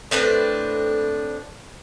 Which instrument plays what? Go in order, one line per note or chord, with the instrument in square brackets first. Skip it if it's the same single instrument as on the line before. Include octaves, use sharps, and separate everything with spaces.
[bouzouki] A2 C4 D4 B4